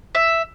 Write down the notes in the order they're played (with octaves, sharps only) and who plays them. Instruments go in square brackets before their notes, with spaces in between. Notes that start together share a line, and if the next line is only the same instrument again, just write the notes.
[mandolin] E5